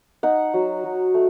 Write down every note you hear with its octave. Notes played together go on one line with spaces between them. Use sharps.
D#4 F#5
F#3
F#3
A3